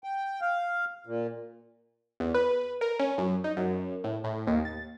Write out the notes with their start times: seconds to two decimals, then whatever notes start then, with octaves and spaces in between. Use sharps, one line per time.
0.04 G5
0.41 F5
1.07 A#2
2.20 E2
2.35 B4
2.81 A#4
3.00 C#4
3.18 F#2
3.44 D#4
3.57 F#2
4.04 A2
4.24 A2
4.47 D#2
4.65 A6